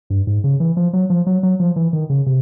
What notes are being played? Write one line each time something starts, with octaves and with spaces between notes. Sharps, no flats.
G2
G#2
C#3
E3
F3
F#3
F3
F#3
F#3
F3
E3
D#3
C#3
C3